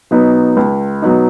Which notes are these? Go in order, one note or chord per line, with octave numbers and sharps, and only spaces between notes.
B2 F#3 B3 D#4
C#2
B2 F#3 B3 D#4